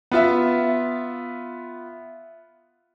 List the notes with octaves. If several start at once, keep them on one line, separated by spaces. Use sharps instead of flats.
B3 F4 E5